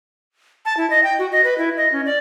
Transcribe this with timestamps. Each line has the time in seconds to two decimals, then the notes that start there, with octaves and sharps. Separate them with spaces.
0.65 A5
0.77 E4
0.90 D#5
1.04 G5
1.19 F#4
1.32 D#5
1.44 B4
1.58 E4
1.77 D#5
1.92 C#4
2.06 D5